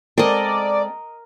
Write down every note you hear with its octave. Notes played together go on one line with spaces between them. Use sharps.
G#3 C4 A4 A#4 D5 D#5